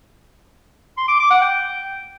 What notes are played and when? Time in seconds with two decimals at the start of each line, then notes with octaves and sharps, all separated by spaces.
0.97 C6
1.08 D6
1.19 D6
1.30 F#5
1.41 G5